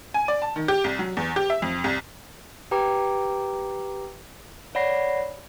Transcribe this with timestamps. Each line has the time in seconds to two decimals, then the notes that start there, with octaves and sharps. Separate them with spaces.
0.14 G#5
0.28 D5
0.42 A5
0.56 D#3
0.68 G4
0.84 C2
0.99 F#3
1.17 E2
1.36 G4
1.50 E5
1.62 F2
1.84 C2
2.71 G4 B4 G5 A#5 D6
4.75 C#5 D5 F#5 B5 A#6 C7